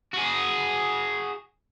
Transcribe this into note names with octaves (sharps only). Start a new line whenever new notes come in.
F#4 G#4